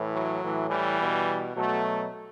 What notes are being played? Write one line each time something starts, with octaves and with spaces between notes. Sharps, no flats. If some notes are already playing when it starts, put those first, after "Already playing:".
Already playing: A2 E3
F#3
A2 E3
E3 G3
B2
B2 F#3 A3